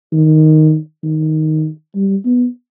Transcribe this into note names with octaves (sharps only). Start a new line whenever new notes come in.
D#3
D#3
G3
B3